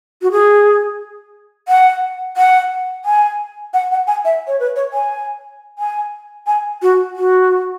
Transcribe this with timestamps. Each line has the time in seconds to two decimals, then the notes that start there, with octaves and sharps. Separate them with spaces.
0.22 F#4
0.32 G#4
1.68 F#5
2.37 F#5
3.05 G#5
3.74 F#5
3.91 F#5
4.07 G#5
4.25 E5
4.47 C#5
4.60 B4
4.76 C#5
4.93 G#5
5.79 G#5
6.47 G#5
6.82 F#4
7.16 F#4